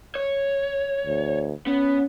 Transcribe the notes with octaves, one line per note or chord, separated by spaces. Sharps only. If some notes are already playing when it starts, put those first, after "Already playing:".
C#5
D2
B3 C#4